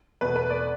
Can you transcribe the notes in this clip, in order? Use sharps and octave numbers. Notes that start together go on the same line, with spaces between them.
E2 B2 A3 B4
B4
D5